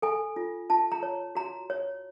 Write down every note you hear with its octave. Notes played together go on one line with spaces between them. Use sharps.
A4 G#5
F4
F4 A5
A#5
C#5
F#4 A#5
C#5